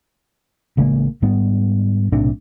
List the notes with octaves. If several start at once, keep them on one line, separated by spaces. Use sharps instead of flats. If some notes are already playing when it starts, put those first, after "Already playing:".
A1 C#3 G#3 A#3
G#2 G3 B3
B1 A2 C3 D4